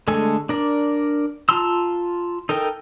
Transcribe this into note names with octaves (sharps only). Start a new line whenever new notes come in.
D3 G#3 A3 A4 G#5
D4 A#4 D5
F4 A5 A#5 C6 E6
D#4 A4 A#4 G5